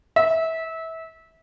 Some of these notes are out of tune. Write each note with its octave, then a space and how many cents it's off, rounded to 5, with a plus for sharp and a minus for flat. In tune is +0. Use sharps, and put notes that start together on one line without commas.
E5 -25